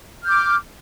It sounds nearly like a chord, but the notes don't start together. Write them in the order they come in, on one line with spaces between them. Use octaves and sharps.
F6 G6 D6